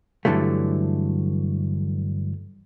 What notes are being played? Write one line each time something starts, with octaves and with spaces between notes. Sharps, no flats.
G2 D3 E3 F#3 A3